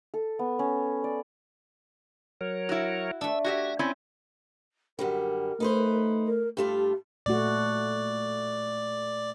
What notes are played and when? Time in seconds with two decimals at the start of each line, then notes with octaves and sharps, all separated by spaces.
0.14 A4
0.39 B3
0.59 C#4
1.04 D5
2.41 F#3 A#4 C#5
2.69 E4 F#4
3.21 A3 D4 E6
3.45 F#4 G4 E5 G#6 A#6
3.79 C4 C#4 E4 D5 G#5
4.99 F#2 D3 G3 A#4
5.60 A3 D#4 B4 C5
6.26 A#4
6.57 G2 A3 F4 G4
7.26 A#2 A3 F#4 D5